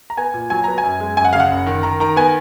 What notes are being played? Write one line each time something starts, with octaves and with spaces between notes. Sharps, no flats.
A#5
B3 G#5
A#2
F#3 G#5
B3 A#5
G#5
F#2
G#3
F#2 G#5
F#5
C#3 F5
F#5
F#1
D#3
D#3 A#5
D#3 A#5
B3 G#5